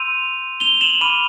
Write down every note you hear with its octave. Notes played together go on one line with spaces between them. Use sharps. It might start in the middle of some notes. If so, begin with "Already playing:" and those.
Already playing: C6 E6 G6 D#7 F7
F7 G7
E7 F#7
B5 D6 F6 D#7 F7